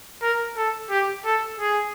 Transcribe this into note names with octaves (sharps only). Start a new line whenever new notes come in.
A#4
A4
G4
A4
G#4